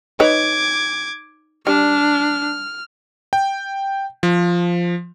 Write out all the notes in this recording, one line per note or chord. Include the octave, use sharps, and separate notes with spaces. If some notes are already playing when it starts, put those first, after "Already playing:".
D#4 B4 C#5 D6 G#6
G3 D4 F6
G5
F3